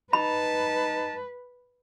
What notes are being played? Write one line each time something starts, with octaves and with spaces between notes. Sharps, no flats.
D#4 B4 A5 B5